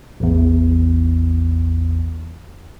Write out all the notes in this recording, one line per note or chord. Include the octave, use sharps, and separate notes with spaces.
A1 E2